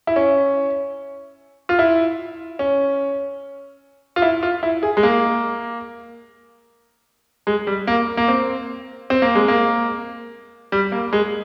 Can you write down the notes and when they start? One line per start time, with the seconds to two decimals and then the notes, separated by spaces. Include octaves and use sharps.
0.07 E4
0.16 C#4
1.69 F4
1.79 E4
2.59 C#4
4.16 F4
4.22 E4
4.43 F4
4.63 E4
4.83 G#4
4.97 G#3
5.03 A#3
7.47 G#3
7.67 G3
7.87 A#3
8.17 A#3
8.28 C4
9.10 C4
9.22 A#3
9.35 G#3
9.48 A#3
10.72 G3
10.92 A#3
11.13 G#3